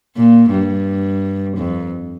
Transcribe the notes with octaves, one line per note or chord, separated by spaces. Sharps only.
A#2
G2
F2